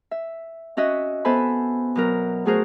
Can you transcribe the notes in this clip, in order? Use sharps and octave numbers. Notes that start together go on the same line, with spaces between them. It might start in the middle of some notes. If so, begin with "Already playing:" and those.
E5
C#4 F#4 D#5 E5
B3 A4 C5 E5 G#5 B5
B2 F#3 A#4
A3 F#4 G#4 A#4 C5